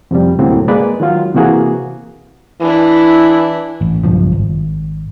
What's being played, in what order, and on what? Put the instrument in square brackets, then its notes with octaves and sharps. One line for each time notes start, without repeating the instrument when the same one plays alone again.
[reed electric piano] F2 C3 G3
D2 A2 C3 F#3 A#3 C4
G#3 A#3 B4 D5
D#3 F#3 F4
C3 E3 A#3 F#4 G#4
[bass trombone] E3 [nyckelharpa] D4 E4
[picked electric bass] A1
F#1 B1 G2 F3
G#1